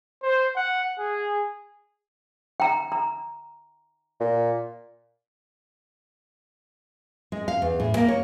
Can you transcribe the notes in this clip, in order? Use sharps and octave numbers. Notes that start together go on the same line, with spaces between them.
C5
F#5
G#4
G5 A#5
A#5
A#2
G#3
F5
E2
A2
A#3
C#5